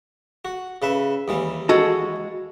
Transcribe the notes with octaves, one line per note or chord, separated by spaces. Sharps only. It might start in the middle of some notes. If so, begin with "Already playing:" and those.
F#4
C#3 B4 E5
D#2 E3 G3
G#3 F#4 A4